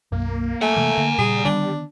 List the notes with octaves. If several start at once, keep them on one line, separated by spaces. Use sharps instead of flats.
B1 F#2 F#3 A#3
A3 F#5 G#5
C3 E3 G#3
D3
A#2 C#3 G3 G#4
D3 D#3 B3 D4